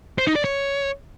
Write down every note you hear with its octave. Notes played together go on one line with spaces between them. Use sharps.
C5
D#4
D5
C#5